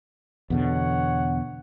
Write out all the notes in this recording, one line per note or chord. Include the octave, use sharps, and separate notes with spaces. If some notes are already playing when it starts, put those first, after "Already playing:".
E2 B2 D3 C#5 F#5